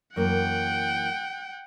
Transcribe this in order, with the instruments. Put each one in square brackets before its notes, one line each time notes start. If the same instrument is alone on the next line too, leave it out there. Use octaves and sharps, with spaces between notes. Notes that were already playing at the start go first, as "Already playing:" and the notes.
[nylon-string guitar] F#2 E3 A#3 [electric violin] F#5 G5